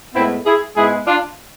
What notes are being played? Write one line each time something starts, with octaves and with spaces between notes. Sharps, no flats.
A2 G#3 B3 C4 E4
E4 G#4
G#2 G#3 B3 E4 G#4
D4 F4